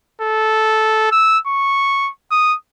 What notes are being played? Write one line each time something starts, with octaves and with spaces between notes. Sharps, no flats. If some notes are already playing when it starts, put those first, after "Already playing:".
A4
E6
C#6
D#6